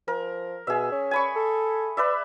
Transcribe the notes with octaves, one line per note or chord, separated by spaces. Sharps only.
F3 A#4
B2 G#4 E5
C#4
G#5 B5 C#6
A4
B4 D5 E5